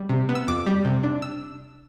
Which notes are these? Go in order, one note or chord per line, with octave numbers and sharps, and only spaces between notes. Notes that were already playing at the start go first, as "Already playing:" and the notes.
Already playing: G3
C3
B3
E6
F2 D6
G3
C3
D4
E6